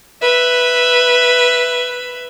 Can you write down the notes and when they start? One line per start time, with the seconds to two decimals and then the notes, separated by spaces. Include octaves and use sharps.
0.22 B4 E5